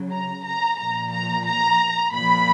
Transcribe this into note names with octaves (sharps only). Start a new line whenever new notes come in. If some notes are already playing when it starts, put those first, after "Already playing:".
Already playing: C#3 F#3
A#5
A#5
A#2 F3 A#5
A#5
A#5
A#2 F3 B5